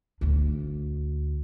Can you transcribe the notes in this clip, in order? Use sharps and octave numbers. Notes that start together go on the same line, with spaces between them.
D2 D4